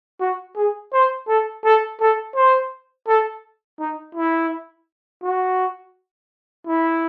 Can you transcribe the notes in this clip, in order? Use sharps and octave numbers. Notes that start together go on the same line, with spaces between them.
F#4
G#4
C5
A4
A4
A4
C5
A4
D#4
E4
F#4
E4